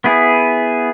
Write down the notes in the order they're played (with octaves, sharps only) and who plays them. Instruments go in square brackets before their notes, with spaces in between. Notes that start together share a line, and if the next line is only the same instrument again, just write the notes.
[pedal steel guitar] B3 E4 G#4